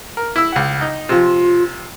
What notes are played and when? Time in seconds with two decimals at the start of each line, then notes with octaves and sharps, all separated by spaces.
0.17 A#4
0.36 E4 E6
0.52 C#2 F#5
0.81 D#4
1.09 C3 F3 F4